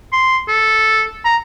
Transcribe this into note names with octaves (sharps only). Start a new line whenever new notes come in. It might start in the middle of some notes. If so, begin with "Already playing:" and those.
C6
A4
A#5